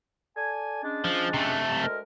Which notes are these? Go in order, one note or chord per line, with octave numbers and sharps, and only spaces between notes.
A4 D5 G#5
G#3 C#4 D4
F3
C3 A3
D2 G#3 A#4